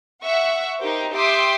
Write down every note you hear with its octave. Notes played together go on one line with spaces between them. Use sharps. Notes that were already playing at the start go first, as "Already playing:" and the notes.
E5 F#5 C#6
D#4 G4 A#4 C5
G4 E5 G5 C6 D6 D#6